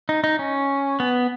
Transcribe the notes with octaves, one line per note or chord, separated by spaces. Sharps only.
D#4
D#4
C#4
B3